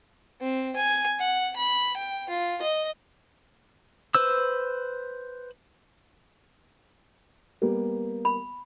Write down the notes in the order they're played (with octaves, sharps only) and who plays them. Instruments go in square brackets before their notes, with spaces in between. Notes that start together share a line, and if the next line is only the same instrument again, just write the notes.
[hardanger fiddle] C4
G#5
F#5
B5
G5
F4
D#5
[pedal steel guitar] B4 C5 E6
[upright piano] G3 A#3 B3
[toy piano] B5